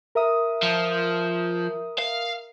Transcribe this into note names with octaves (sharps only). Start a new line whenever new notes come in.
A#4 E5 D#6
F3
F5